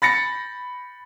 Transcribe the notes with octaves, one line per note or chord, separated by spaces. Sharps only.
B5 A6 A#6 C#7